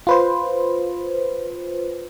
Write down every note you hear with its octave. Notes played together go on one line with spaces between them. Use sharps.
F4 B4 C5